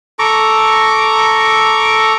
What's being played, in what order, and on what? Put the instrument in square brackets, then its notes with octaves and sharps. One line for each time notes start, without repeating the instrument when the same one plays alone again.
[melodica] A4 A#5 C#6 D6